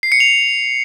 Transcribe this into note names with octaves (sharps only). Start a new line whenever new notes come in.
C7
C#7
F7